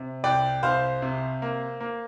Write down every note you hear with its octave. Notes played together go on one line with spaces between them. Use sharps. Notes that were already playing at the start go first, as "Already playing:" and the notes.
Already playing: C3
C2 D5 G5
C2 C5 F5
C3
A#3
A#3